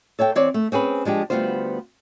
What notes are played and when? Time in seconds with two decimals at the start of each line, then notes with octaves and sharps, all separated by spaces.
0.19 A4 C#5 E5 G5
0.35 E3 C4 C#5 D5
0.54 A3
0.72 C4 C#4 G#4 B4
1.05 F3 G#3 D4 G4
1.30 D2 A#2 G3 B3 F4 C5